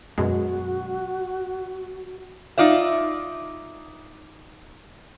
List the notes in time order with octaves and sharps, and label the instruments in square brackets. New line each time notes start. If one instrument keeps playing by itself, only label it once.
[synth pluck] F#2 B2 G#3 [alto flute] F#4
[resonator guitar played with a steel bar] D#4 F4 D5 E5